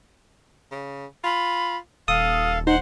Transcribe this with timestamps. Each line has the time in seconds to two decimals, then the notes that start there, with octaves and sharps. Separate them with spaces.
0.72 C#3
1.24 F4 B5
2.08 D#1 A4 F5 D#6
2.67 D#4 C5 F#5